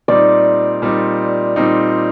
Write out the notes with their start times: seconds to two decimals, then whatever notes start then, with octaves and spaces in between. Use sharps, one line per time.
0.08 A#2 G3 C4 D#4 D5
0.82 A#2 G3 C4 D#4
1.56 A#2 G3 C4 D#4